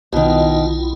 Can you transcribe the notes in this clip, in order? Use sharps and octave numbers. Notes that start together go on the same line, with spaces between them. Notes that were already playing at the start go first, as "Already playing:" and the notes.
B1 B2 D#3 E4 F4